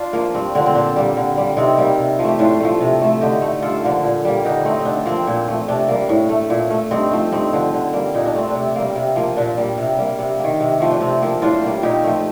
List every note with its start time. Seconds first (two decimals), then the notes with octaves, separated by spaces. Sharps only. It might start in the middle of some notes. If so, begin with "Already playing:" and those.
Already playing: D4 F4
0.13 F3 A#3
0.34 G2 C4
0.55 D3 F3 C4
0.66 C4
0.75 A#2 D4
0.96 G3 A#3
1.17 D3
1.37 G3 A#3
1.57 C3 C4 D#4
1.78 G3 A#3
1.98 C3
2.19 F3 A3
2.29 G4
2.39 A2 D4 F4
2.60 F3 A3
2.81 C3
3.02 F3 A3
3.21 D3 D#4 G4
3.42 A3
3.62 G2 F4 A4
3.83 D3 F3 A#3
4.03 A#2
4.25 G3 A#3
4.45 D3 D#4 G4
4.65 A3 C4 D#4
4.80 D3 D4 D#4
5.06 F3 A#3 C4
5.27 A#2
5.48 F3 A3
5.68 C3 D4
5.88 G3 A#3
6.09 A2
6.29 A3
6.50 A#2
6.70 A3
6.91 G2 C4 D#4
7.11 F3 A3
7.32 G2 C4 D#4
7.53 D3 F3
7.74 D3
7.93 G3 A#3
8.14 A#2 D#4
8.25 D4
8.35 A3 C4
8.50 D4
8.55 C3
8.76 G3 A#3
8.96 C3
9.16 F3 A#3
9.37 A#2 D4
9.58 G3 A#3
9.78 C3
9.98 G3 A#3
10.19 C3
10.39 D#3 A#3
10.60 C3
10.80 F3 A3
10.91 D4
11.01 C3 C4
11.22 F3 A#3
11.42 A2 D4 F4
11.64 G3 A#3
11.83 A#2 D#4 G4
12.03 F3 A3